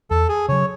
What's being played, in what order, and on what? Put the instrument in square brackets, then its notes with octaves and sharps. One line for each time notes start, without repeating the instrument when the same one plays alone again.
[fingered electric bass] E2 [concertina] A4
[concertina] G#4
[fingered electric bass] C#3 F#3 [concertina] C#5